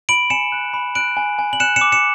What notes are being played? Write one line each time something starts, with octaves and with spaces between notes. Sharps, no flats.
B5 D7 F#7
G#5 C#7 E7
F#6
B5
F#6 D7 F#7
G#5
G#5
F#7
F#6 C#7 E7
C#7 E7
D6
C#7 E7